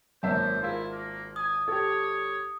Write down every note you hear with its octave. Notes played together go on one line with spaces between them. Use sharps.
G#1 F#2 A#3 C5 E5 A5
E4 F4 G#4 A#4
A#3
G#5 D#6
G4 A4 C#5